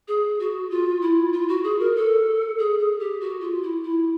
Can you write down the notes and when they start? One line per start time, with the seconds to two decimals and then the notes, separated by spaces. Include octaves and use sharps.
0.08 G#4
0.40 F#4
0.70 F4
1.02 E4
1.33 F4
1.48 F#4
1.64 G#4
1.80 A#4
1.96 A4
2.59 G#4
2.79 G#4
3.00 G4
3.21 F#4
3.41 F4
3.63 E4
3.83 E4